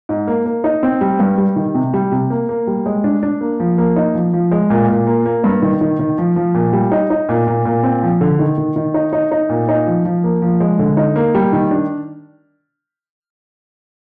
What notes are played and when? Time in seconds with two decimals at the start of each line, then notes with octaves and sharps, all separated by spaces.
0.09 G#2
0.27 A#3
0.46 A#3
0.64 D#4
0.83 C4
1.01 G3
1.19 G2
1.38 G3
1.56 D#3
1.74 C3
1.94 G3
2.12 C3
2.30 A#3
2.49 A#3
2.67 G3
2.86 G#3
3.04 D4
3.23 D4
3.41 A#3
3.60 F3
3.78 A#3
3.96 D#4
4.15 F3
4.33 F3
4.51 G#3
4.70 A#2
4.89 A#2
5.07 A#3
5.26 A#3
5.44 G2
5.62 D#3
5.81 D#3
5.99 D#3
6.18 F3
6.36 F3
6.55 A#2
6.73 G3
6.92 D#4
7.10 D#4
7.29 A#2
7.47 A#2
7.65 A#2
7.84 C4
8.03 F3
8.21 D3
8.39 D#3
8.58 D#3
8.76 D#3
8.94 D#4
9.13 D#4
9.31 D#4
9.49 A#2
9.68 D#4
9.87 F3
10.05 F3
10.24 A#3
10.42 F3
10.60 G#3
10.79 D3
10.97 D#4
11.16 A#3
11.35 G3
11.53 D#3
11.71 D4